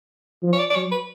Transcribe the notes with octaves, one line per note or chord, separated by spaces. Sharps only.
F3
C#5
D5
D5
F#3 C#5
B4